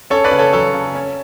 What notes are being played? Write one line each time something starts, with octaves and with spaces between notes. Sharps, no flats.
C#4 A4 C#5
B4 D5
C#3
A4 C#5
F#3 A4 C#5
C#3
C#4